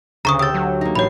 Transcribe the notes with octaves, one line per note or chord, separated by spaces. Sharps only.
D2 C#3 A#5 C#6 D#6
G4 D#6 E6 G6 A6
F#3
A#3 D#4
A1 C#5 B5 C7